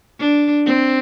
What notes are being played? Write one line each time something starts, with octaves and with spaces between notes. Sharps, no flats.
D4
C4